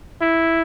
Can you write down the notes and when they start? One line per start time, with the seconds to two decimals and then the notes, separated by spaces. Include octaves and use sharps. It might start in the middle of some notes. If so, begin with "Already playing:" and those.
0.21 E4